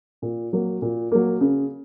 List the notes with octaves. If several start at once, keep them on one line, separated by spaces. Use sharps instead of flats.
A#2
F#3 A#3
A#2
F#3 A#3
C#3